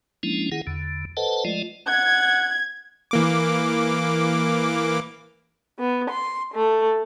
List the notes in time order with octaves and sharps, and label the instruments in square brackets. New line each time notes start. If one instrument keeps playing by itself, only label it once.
[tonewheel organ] F3 G#3 A#3 C#4 D4 E4
D#3 E4 G#4 F#5
E2 D3
A4 B4 C5 D#5 F#5 A5
F3 G#3 A3 F4 D5 D#5
[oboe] F#5 [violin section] G#6
[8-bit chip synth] E3 A#3 D6
[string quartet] B3
C6
A3